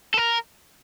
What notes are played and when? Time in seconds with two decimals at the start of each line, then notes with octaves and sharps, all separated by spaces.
0.14 A4
0.17 A#4